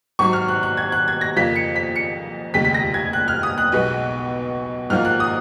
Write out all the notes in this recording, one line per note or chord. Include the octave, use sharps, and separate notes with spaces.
G#1 G#2 F#3 C#6
F6
F#6
F#6
G#6
F#6
G#6
A#6
F2 C#3 F3 A#3 B6
C#7
B6
C#7
F1 D#2 C#3 G#3 B6
B6
A#6
G#6
F#6
F6
D#6
F#6
B1 B2 G#3 B3
G#1 G#2 F3 A#3 F6
F#6
D#6